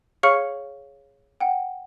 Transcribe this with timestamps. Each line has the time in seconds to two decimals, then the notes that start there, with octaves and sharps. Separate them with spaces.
0.23 G#4 C#5 F5 C#6 F6 C#7
1.40 F#5 G5